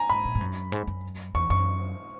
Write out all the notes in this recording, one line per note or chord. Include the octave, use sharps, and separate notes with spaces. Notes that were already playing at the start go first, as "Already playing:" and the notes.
Already playing: G#5 A#5
G#2 B5
A#2
G#2
F#2
G#2
F#2
E2 C#6
F#2 C#6